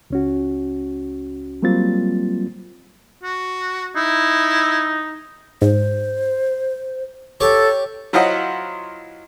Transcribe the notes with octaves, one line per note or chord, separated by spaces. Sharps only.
C#2 C#4 F#4
F#3 G3 A#3 C4 F4 A6
F#4
D#4 E4
G#2 C5
G4 A4 C#5
F#3 E4 F4 C5 D#5 F#5